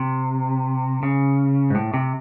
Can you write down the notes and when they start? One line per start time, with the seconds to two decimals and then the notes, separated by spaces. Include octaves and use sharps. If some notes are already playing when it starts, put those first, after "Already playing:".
Already playing: C3
1.03 C#3
1.70 G#2
1.75 A2
1.94 C3